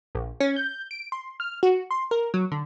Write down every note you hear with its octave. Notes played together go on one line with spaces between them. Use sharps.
A#1
C#4
G6
D7
C6
F6
F#4
C6
A#4
F#3
D3